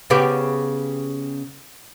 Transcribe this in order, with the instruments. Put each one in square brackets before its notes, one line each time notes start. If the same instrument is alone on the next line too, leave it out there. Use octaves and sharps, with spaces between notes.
[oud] C#3 B3 G4